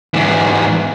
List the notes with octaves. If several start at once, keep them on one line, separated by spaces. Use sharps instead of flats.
G#2 E3